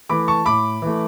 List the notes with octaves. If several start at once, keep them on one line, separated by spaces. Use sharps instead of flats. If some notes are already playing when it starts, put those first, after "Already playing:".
E3 A3 B5 D6
A5 C#6
A2 B5 D6
E3 A3